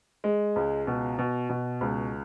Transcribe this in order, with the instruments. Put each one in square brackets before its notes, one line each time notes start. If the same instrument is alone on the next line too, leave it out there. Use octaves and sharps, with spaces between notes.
[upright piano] G#3
C#2
B2
B2
B2
C#2